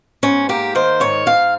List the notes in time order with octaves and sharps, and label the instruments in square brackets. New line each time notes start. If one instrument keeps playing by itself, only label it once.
[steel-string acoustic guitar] G#2 C#4
A#3 G4
D#3 C5
G#2 C#5
G#2 F5